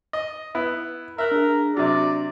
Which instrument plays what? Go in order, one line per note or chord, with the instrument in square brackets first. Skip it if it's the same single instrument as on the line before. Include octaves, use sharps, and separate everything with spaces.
[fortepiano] D#5
[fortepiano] B3 E4 [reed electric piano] B5
[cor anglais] A#4 [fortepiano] E5 F#6
[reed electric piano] D4 G#4
[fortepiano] C3 F#3 [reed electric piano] D4 [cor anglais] D5